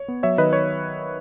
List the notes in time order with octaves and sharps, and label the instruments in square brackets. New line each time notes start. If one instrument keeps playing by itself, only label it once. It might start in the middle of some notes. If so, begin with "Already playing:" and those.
Already playing: [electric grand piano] C#5
B3
F#3 C#5 E5
D#3 B4 D#5
C#5